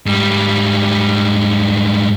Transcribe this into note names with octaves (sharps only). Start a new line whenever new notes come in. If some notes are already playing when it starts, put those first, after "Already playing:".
G#2 G3